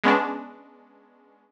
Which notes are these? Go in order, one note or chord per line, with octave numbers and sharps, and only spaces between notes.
G#3 B3 C#4 D4